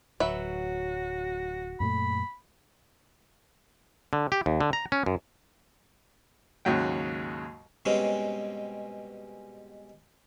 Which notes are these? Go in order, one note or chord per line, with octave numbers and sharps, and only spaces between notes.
D1 F#3 F#4 B4 E5
F#2 A#2 A3 B5
D3
G4
D#2
D3
A#5
C#4
F#2
D#2 G#2 C#3 F#3 F#5 G5
G#2 B2 G3 G#3 C4 C#4